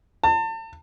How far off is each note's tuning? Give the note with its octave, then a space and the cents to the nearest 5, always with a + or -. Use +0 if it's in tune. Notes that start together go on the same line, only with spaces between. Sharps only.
A5 +35